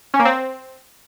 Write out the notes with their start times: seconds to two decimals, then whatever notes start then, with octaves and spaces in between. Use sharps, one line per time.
0.14 C#4
0.20 A#3
0.25 C4